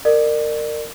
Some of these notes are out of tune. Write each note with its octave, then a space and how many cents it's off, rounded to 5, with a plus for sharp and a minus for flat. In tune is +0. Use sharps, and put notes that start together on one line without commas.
A#4 -20 D5 +35